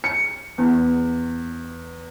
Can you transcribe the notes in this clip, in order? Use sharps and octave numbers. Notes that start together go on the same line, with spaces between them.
C#7
E2